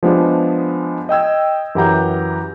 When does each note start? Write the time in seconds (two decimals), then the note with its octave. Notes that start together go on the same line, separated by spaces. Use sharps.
0.03 F3 G#3 B3 D4 G4
1.09 D#5 G5 E6 G#6
1.75 F#2 E3 G4 F#5 A#5 G6